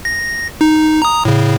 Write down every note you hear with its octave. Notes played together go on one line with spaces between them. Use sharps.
A#6
D#4
A#5 D#6
A2 C#3